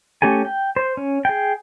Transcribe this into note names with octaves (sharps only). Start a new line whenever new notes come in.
A3 C#4 G4 A4 G#5
G5
C5
C#4
G#4 G5